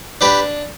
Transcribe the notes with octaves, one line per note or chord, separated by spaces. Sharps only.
D4 G4 B4